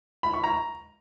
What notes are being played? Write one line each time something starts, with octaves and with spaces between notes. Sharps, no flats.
B5
C#6
A#5